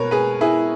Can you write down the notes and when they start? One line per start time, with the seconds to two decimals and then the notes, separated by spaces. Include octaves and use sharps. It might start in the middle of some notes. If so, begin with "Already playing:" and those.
Already playing: B2 A#4 B4 C#5
0.11 G#4 B4
0.41 E4 G#4